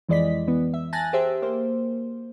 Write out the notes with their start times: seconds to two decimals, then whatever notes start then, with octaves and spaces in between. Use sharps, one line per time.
0.09 F2 E3 G#3 D5 D#5 B6
0.47 E3 B3
0.74 E5
0.93 G#5 A5 F#6 A6 A#6
1.13 G4 G#4 C5 E5
1.42 A#3 C5